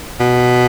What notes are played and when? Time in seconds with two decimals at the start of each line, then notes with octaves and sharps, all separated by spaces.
0.20 B2